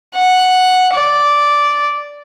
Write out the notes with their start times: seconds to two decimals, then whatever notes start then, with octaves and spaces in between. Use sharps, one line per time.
0.15 F#5
0.93 D5